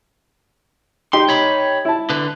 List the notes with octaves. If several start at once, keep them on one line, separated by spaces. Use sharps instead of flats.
D#4 G4 G5 C6
C#5 B5
E4 A5
D3 B4